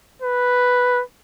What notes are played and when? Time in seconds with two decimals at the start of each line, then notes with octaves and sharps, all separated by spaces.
0.22 B4